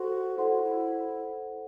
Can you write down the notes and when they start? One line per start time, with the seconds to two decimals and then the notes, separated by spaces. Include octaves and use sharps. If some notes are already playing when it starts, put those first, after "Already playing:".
Already playing: F#4 A4 C5 F#5 C6
0.38 E4 A4 C5 F#5 C6
0.51 F#4
0.62 E4